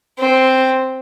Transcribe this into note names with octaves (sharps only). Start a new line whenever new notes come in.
C4